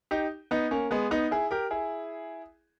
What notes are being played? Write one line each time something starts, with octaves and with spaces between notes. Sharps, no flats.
D#4 G4
B3 D#4
A#3 C#4
G#3 B3
B3 D#4
E4 G#4
G4 A#4
E4 G#4